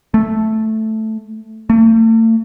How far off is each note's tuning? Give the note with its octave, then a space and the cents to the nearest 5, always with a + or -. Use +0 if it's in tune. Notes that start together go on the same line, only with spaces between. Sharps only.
A3 +0
A3 +40